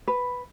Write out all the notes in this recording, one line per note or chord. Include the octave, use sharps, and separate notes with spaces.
B4